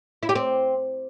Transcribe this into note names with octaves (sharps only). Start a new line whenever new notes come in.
E4
G4
C4